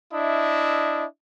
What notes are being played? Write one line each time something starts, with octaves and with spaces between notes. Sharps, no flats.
D4 E4 D#5 E5